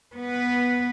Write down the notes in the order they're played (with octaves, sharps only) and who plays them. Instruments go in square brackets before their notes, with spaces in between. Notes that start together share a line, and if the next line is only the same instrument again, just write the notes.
[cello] B3 B4